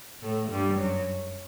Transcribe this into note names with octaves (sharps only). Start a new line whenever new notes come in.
A2 A3
G2 G3
F#2 F#3